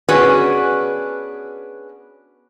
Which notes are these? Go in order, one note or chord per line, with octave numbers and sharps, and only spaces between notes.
B3 C#4 D4 F#4 G#4 B4